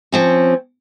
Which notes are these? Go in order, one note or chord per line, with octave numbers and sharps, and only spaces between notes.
F3 C4 C#4